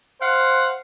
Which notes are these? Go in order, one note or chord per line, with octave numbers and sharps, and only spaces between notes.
C5 F5 F#5